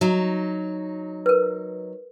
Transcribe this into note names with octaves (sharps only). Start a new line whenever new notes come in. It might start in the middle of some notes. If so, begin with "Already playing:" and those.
F#3 D#4
A#4 B4